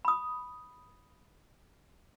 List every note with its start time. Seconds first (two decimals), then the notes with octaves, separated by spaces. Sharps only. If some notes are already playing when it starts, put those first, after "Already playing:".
0.05 B5 D#6